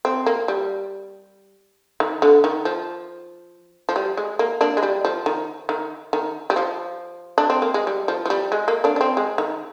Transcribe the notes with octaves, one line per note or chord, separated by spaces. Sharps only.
C4
A#3
G3
D#3
D3
D#3
F3
F3
G3
G#3
A#3
A#3 D4
G#3
G3
F3
D#3
D#3
D#3
G3
F3
D4
C4
A#3
G#3
G3
F3
F3
G3
G#3
A#3
A#3 D4
D4
C4
G#3
D#3